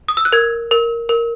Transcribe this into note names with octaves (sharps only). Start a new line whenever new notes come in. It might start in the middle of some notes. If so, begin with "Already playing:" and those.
D#6
E6
F#6
A#4 G#6
A#4
A#4